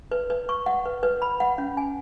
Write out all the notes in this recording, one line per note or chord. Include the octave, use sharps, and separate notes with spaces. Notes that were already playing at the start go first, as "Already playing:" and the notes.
B4
B4
C#6
F#5
B4
B4
B5
F#5
C#4
G#5